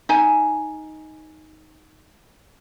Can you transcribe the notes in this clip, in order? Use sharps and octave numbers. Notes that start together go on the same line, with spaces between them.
D#4 G#5